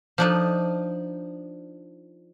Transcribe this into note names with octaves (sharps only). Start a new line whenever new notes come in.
F3 D4 D#4